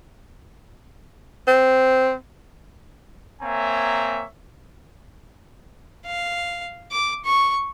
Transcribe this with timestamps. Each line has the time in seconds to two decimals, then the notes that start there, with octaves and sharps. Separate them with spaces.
1.47 C4
3.42 A#3 C4 C#5 E5 G#5 A#5
6.05 F5
6.92 D6
7.25 C#6